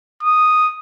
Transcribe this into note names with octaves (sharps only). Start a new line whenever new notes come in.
D#6